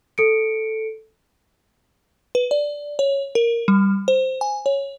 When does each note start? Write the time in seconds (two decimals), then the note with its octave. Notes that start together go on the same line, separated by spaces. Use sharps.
0.18 A4 C#7 D7
2.35 B4
2.51 D5
2.99 C#5
3.35 A#4
3.68 G3
4.08 C5
4.41 G#5
4.66 C#5